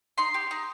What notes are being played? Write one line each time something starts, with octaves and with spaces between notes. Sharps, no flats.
D#4 C6
G4
D#4